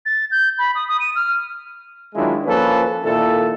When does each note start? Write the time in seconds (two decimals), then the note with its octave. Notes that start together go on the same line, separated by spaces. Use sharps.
0.06 A6
0.31 G6
0.58 B5
0.75 D#6
0.88 D#6
1.00 D#7
1.15 F6
2.15 D#3 F#3 G#3 D4 E4 F4
2.45 F3 A#3 C#4 A4 B4
3.04 A#2 D#3 E4 A4